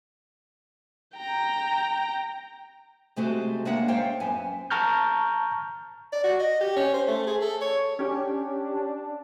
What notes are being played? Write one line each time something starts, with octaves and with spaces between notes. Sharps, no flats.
G5 A#5
C3 G#3 A3 C4 F#4 G4
G#3 A#3 D4 C#5 E5 F#5
C5 C#5 F5 G5
F#2 B3 G#5
A5 A#5 C#6 F6 G6
D5
F#4
D#5
G4
C#4
C5
A3
G#4
A4
C#5
C#4 D4 G4